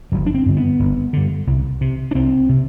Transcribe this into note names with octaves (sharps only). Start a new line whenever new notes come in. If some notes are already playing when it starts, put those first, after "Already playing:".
G1 F#3
D4
C4
G2 D3
B3
G1
G2 D3
C2
C3
D4
C2 C4
C3